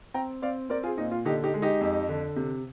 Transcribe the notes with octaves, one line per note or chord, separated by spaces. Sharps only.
C4 G5 A#5
C4 D5 F5
C4 A#4 D5
F4 G#4
A#2 D#4
F4
D3 D#4 G4
D#4 G4
G#3
D#4 G4
F2
D3
C3